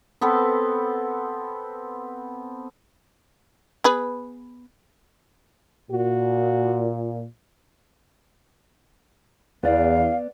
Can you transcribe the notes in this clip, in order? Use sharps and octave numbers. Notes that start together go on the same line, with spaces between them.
B3 C4 A4 B4
B3 G#4 B4
A#2 F#4
E2 B3 D5 F5